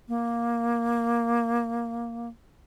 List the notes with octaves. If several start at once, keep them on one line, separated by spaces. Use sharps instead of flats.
A#3